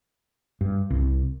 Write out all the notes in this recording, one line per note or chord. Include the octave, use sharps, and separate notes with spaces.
G2
C2